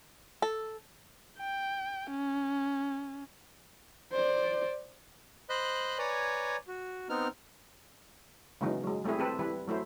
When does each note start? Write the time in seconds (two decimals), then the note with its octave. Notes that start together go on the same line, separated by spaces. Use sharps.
0.42 A4
1.38 G5
2.10 C#4
4.13 C5 D5
5.49 C5 D#5 B5 F#6
5.98 B4 C#5 D5 G#5 A#5
6.68 F#4
7.09 B3 C4 D#4 F6
8.61 C#3 E3 F#3 G#3 A#3 D#4
8.84 F#3 G#3
9.04 G3 A3 C4 E4 G#4
9.19 C4 G4 A4 B4
9.39 E3 G3 E4 B4
9.68 F#3 A3 E4 C5